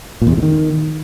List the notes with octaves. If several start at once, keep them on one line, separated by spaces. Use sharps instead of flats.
A#2
E2
C3
A2
D#3